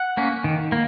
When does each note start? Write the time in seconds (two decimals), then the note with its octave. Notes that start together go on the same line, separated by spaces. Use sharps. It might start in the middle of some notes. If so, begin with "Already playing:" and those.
Already playing: F#5
0.17 A#3 C#4
0.44 D#3
0.72 A#3